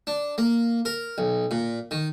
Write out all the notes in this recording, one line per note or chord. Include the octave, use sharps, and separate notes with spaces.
D4
A#3
A#4
B1
A#2
D#3